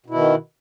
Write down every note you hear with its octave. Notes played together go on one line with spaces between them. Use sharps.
B2 D#3 E4